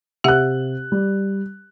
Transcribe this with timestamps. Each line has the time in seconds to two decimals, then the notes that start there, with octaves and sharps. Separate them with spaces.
0.24 C3 G4 E5 F#5 F#6
0.92 G3